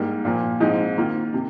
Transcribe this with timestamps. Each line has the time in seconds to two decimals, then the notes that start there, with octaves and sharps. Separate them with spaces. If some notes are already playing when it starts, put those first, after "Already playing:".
Already playing: G#2 G3 A#3
0.25 A#2 F3 A#3
0.60 G#2 F3 C4 D#4
0.97 D#3 A#3 F4
1.34 C3